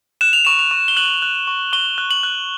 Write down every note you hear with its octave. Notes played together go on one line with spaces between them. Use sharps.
F#6 E7
F7
C#6 E7
F7
C#6
G7
F#6 F#7
F#6
C#6
C#6 G7
F#6
F#7
F#6